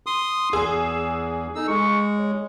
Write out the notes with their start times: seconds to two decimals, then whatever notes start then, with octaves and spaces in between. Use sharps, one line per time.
0.07 C6 D#6
0.53 E2 G#4 E6
1.55 D#4 A4 E6
1.68 G#3 C#6
2.19 C#5